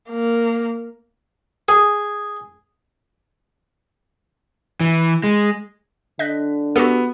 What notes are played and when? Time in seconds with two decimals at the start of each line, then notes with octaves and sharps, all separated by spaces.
0.11 A#3
1.69 G#4
4.81 E3
5.24 G#3
6.19 D3 D#5 F#6 B6
6.76 B3 F#4 G4 A4